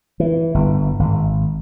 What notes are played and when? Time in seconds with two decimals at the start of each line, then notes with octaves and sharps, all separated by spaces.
0.20 E3
0.54 G1
0.99 G#1